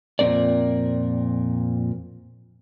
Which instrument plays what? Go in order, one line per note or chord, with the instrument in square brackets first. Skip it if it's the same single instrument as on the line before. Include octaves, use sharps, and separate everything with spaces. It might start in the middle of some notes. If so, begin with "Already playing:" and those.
[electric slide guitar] F2 A#2 F3 C4 A#4 D5